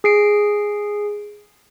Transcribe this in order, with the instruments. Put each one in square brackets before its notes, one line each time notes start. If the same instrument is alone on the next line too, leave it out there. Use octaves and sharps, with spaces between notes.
[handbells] G#4 C7 D7